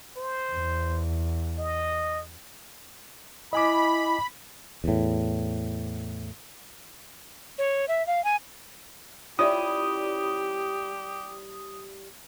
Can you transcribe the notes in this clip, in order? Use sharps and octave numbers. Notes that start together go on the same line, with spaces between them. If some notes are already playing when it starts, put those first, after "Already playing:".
C5
E2
D#5
E4 D#5 G#5 B5 D6
E2 A2
C#5
E5
F5
G#5
G3 C#4 E4 F4 G4 D5 D#6